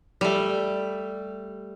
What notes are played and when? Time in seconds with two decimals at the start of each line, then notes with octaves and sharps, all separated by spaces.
0.21 G3 A3